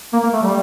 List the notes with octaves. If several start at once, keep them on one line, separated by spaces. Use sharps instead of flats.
A#3
A#3
A3
G3